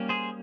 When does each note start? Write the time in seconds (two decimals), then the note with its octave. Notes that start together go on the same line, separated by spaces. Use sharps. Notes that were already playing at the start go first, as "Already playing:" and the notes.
Already playing: G3 A#3 C#4
0.09 G#4 C5